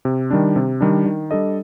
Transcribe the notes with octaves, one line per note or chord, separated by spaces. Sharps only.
C3
D#3 G3 D4
C3
D#3 G3 D4
D#3
G3 D4 A4 D#5